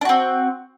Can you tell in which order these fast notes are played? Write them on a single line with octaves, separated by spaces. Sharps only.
D4 F#4 C4